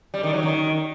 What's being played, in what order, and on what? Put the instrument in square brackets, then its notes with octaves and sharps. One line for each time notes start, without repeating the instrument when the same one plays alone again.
[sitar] G3
D#3
F#3
D#3